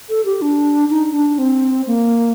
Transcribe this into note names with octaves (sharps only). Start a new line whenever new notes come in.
A4
G4
D4
D#4
D4
C4
A#3